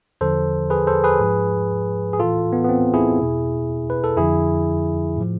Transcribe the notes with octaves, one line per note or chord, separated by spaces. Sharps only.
E2 D3 F3 A4 C5
G#4 B4
A4 C5
G#4 B4
G#2 F3
G#4
A2 E3 F4 A4
B3
B3
C4
E4 G#4
E2 B2
B4
A4
F2 D3 F3 E4 G#4
A2 F3